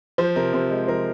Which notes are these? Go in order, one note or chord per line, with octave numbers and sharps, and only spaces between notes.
F3 C5
C3 A#4
C3 C5
G#3
C5
F3 A#4